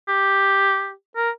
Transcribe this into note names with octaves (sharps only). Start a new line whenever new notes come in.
G4
A#4